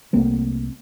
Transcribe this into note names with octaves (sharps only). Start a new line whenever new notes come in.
C2 A3 A#3 C4